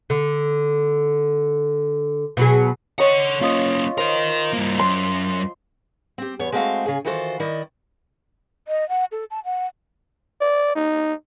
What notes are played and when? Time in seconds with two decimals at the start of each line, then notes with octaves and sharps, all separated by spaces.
0.10 D3
2.37 B2 F#3 G#4
2.99 A4 C#5 D#5 F#5
3.41 A#3 C#4 F4 D#5
3.98 A#4 C5 D#5
4.53 G2 A#3
4.79 F#2 C6
6.18 C4 G4
6.39 E2 B3 C#5
6.52 G#3 A3 C4 E4 F#4 F5
6.86 C#3 G#4
7.05 D#3 E3 F4 F#4 A4 C5
7.40 D#3 E4 D5 D#5
8.68 D#5
8.89 F#5
9.12 A4
9.31 A5
9.45 F#5
10.41 D5
10.76 D#4